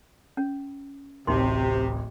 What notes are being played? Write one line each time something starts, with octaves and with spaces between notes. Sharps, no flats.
C#4
D1 A1 C3 D#4 C6